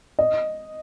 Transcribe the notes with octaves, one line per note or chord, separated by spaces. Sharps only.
D#5